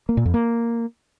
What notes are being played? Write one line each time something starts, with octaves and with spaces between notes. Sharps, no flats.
A#3
A#2
F2
A#3